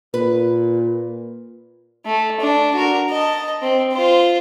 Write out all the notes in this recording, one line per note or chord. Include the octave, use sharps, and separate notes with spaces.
A#2 B4
A3
D4
F#4 A#4
D#5 A5
C4
F4 C5